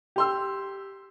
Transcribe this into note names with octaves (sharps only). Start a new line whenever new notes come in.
G4 C6 E6